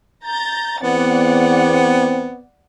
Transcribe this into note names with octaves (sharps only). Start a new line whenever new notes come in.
A#5 G6 A6
E2 B3 C4 D5 F#5